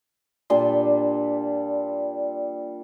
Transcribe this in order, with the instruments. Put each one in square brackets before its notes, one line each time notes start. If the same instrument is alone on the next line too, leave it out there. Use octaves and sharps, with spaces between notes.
[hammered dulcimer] A#2 G3 D4 C6